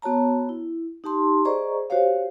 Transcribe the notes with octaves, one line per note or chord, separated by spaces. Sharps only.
B3 F#4 C#5 A5 A#5
E4
D#4 G4 A5 C6
G#4 C5 D5 D#5 A#5 C#6
F#4 G4 C5 C#5 F5